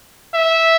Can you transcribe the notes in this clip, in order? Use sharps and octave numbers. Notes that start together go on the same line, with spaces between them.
E5